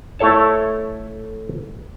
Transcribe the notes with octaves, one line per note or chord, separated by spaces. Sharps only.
A3 E4 A4 C#5 A5